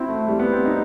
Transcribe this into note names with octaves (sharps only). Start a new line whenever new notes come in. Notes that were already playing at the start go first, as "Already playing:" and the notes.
Already playing: C4 E4 F#4
A3
G3
B3
C4
D#4